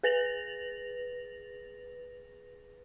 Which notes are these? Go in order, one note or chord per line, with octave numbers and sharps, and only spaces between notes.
G#4 B4 A6 A#6 F7 F#7